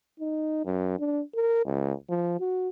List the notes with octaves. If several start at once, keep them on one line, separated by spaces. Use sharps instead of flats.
D#4
F#2
D4
A#4
C#2
F3
F#4